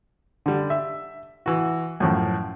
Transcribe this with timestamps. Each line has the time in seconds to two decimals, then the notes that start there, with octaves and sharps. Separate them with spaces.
0.46 D3 G3
0.70 E5
1.46 E3 F#4
2.00 F#2 A2 F3